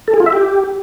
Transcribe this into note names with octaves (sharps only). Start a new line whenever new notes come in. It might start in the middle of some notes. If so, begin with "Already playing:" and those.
A4
G#4
F4
E5
G4